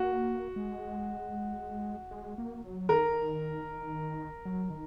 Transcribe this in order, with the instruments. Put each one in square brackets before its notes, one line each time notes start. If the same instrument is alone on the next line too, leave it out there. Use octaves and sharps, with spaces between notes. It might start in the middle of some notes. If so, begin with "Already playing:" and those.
Already playing: [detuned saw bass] A#3 [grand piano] F#4
[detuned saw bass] G#3
G#3
A#3
F#3
[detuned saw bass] D#3 [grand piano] A#4
[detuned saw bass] F#3
D#3